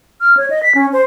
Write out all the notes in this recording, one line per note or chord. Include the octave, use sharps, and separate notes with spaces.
F6
C#5
D#5
B6
C#4
C5